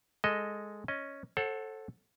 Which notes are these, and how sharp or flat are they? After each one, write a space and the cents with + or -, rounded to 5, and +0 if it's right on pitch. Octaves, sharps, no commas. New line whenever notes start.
G#3 +0 A4 +5 D#5 +0
C#4 +0 D#5 +0
A4 +0 C5 +45 F#5 +0